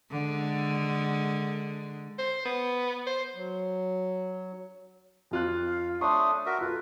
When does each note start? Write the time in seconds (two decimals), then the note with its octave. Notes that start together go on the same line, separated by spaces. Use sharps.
0.11 D3 G#3
2.18 C5
2.45 B3
3.07 C5
3.35 F#3
5.31 F2 F4 F#6
5.66 F5
6.01 A3 D4 C#5 C6 C#6 D#6
6.46 F#4 A#4 E5
6.61 F4 A4 B4